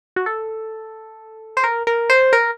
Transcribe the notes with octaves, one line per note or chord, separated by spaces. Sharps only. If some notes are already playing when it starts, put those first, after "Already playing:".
F#4
A4
C5
A#4
A#4
C5
A#4